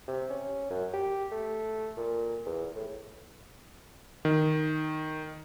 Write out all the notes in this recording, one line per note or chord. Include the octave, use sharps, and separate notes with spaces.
C3
C#4
F#2
G4
A3
A#2
E2
A2
D#3